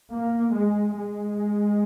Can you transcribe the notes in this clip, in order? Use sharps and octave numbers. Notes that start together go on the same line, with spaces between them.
A#3
G#3
G#3